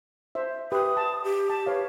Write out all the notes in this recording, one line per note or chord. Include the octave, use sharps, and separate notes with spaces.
C5 E5
G4 B4 E5 D#6
A5
G4
A5
B4 C#5 F5